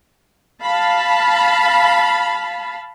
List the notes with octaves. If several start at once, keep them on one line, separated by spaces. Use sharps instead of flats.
F5 A5 B5